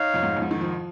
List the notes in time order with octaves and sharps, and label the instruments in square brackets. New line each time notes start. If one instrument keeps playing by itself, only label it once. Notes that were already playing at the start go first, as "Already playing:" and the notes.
Already playing: [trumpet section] D#4 C#5 F5
[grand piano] F2
G#2
F2
G#2
D#3
F3